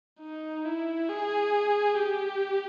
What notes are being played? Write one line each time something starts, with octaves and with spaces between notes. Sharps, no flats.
D#4
E4
G#4
G4